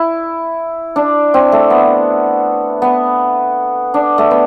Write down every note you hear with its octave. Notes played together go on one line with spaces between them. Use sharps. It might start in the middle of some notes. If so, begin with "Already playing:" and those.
Already playing: E4
D4
C4
A3
B3
B3
D4
A3
B3